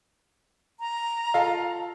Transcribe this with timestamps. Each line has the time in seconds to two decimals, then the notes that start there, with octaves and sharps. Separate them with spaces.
0.80 A#5
1.34 F4 A4 F5